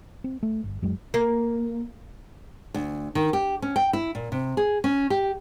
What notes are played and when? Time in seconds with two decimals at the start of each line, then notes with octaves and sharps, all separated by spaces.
0.24 C4
0.43 A3
0.64 G1
0.82 F#2 F#3 G#3
1.14 A#3
2.74 D2
3.15 D#3
3.33 G4
3.62 C#4
3.76 G5
3.93 E4
4.15 A#2
4.32 C3
4.57 G#4
4.84 C#4
5.10 G4